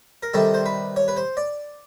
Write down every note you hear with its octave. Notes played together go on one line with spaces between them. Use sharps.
A#4
C3 D#3 G3 A4
C5
B4
C#5
B4
C5
D5